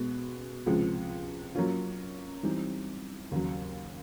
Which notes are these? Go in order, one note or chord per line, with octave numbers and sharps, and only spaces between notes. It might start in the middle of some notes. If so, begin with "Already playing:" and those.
Already playing: B2 G#3 B3
C#2 C3 F3 G#3
F#3 A#3 C#4 F4
E3 G3 C4 D#4
D#2 C#3 F#3